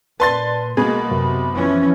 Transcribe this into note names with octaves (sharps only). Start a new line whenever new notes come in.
A#2 B4 D5 A5 C6 A6
B2 G#3 A#3 G#4 B5
F#2 C3
E3 F3 C#4